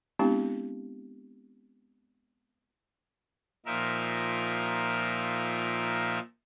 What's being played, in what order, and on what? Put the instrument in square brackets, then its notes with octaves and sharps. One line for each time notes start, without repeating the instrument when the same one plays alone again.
[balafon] G#3 B3 C4 D4 E4 G4
[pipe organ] A#2 F3 D#4 A#4 E5